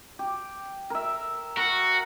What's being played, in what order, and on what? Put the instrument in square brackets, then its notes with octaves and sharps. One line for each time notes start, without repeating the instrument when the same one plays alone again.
[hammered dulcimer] G4
A#4 E5
[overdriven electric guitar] F#4 [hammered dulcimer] A#4